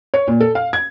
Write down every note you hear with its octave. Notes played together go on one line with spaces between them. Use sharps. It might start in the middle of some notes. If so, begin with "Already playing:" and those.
C#5
A#2
A4
F5
G#6